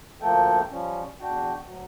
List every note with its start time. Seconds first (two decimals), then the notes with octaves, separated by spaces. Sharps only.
0.22 D2 F3 A3 A#3 A4 G5
0.71 F3 G3 C#4
1.20 E2 D4 F#4 G5
1.64 D2 F#3